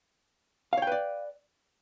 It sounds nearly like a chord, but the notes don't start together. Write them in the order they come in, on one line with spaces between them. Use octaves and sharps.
F5 C#5 G5 B4 D5